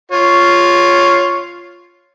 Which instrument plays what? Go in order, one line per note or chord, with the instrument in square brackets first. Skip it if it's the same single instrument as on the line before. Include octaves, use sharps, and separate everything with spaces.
[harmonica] F4 C#5